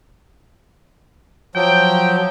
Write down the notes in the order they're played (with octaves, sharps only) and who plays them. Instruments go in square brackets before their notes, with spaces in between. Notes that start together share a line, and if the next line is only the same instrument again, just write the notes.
[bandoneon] F3 F#3 [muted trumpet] G5